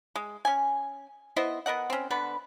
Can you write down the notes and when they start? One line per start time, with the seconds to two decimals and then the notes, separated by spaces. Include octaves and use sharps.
0.15 G#3
0.45 C#4 G#5
1.36 B3 E4 C5 D#5
1.66 B3 A#4 D#5 F#5
1.90 C4 C#4
2.10 D3 B3 B4